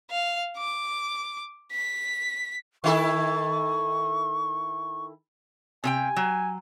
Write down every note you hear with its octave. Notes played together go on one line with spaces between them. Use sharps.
F5
D6
B6
D#3 E4 A4 C#6
C3 G#4 G5 G#5
F#3